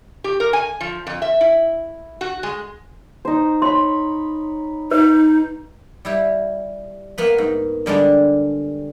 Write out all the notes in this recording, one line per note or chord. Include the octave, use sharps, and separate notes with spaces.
G4
A#4
G#5
F3
F2
E5
E4
F#4
G#3
D#4 C5
C#5 B5 C6
D#4 B4
G3 E4 G4
A#3 B3 B4
G#2
D3 G3 G#3 D4